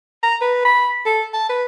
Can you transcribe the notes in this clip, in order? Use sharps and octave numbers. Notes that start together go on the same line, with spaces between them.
A#5
B4
B5
A4
A5
B4